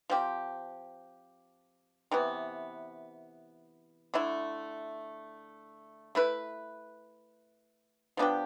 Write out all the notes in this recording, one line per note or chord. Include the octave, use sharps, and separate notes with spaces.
F3 C4 G4
C3 E3 B3
D3 A3 E4
A3 E4 B4
F3 B3 D4 G4